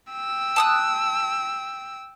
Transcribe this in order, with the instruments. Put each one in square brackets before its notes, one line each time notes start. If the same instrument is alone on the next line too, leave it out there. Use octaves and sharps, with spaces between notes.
[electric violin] G5 E6
[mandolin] A5 D#6 F#6